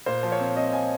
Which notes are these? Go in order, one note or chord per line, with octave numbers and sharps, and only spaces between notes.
A#2 C5
F3
C#5
C4
C4 D#5
F3 G#5